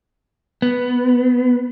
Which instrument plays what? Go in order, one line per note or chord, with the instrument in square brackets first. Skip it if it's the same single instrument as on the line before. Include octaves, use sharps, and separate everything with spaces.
[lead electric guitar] B3